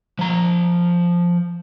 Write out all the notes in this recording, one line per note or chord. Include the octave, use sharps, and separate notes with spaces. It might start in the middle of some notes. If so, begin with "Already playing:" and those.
F3 A#5